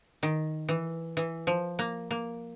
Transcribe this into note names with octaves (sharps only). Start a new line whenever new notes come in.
D#3
E3
E3
F3
A#3
A#3